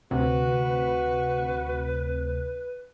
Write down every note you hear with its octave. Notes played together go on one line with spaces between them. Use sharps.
D2 C3 F#4 B4